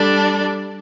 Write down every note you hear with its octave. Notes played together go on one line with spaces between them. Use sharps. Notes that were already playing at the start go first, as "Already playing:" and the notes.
Already playing: G3 D4 A4 D5